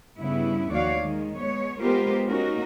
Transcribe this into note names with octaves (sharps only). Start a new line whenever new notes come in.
G2 C#3 G3 B3 E4
D#2 F3 F#4 C#5 D5 F5
D#3 G#3
G#3 B3 C#5
G#3 B3 F4 G4 A#4 C5
A#3 C#4 D#4 F#4 A#4